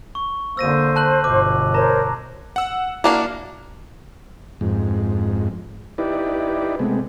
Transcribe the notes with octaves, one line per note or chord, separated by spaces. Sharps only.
C#6
D3 A#3 C5 E6 A#6 D#7
A5 F#6 F#7
G1 B2 D6
A#4 C5 C#5 A5 A#5 A#6
F#5 E6
A#3 D4 E4 F#4 F5
F2 G#2
D#4 E4 G4 B4 D5
C3 G#3 A3 B3